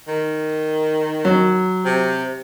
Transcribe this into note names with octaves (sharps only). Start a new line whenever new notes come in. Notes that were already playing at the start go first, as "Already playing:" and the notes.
D#3
F#3
C3